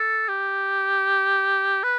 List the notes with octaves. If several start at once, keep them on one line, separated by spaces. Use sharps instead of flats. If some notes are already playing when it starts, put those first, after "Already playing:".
Already playing: A4
G4
B4